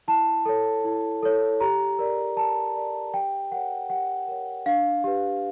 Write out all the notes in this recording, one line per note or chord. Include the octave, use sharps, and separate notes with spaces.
E4 A5
A4 C#5
E4
A4 C#5
G4 A#5
A#4 D5
G4 A5
A#4 D5
G4 G5
A#4 C#5 F#5
G4 F#5
A#4 C#5
D4 F5
G4 B4